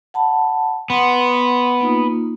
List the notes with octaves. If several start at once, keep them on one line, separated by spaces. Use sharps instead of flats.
F#5 A5 B5
B3 F#5 C6
A#3 D#4 F4